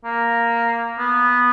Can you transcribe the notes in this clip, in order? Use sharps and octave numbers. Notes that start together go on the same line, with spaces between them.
A#3
B3